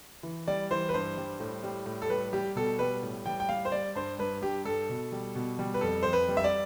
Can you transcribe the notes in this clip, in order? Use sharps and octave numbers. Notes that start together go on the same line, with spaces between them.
E3
G3 D5
E3 C5
B4
G2 C5
G3
A2
G3
A2
A4
G3 B4
G3 G4
B2 A4
G3 B4
A2
G3 G5
G5
G3 F5
C5
G3 D5
G2 C5
G2 B4
G2 G4
G2 A4
B2
G3
B2
G3
B4
F2 A4
F2 C5
B4
G3
E5
D5